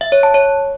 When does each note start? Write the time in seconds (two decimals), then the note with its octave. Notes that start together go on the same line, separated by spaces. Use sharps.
0.01 E5
0.12 C#5
0.23 A5
0.34 C#5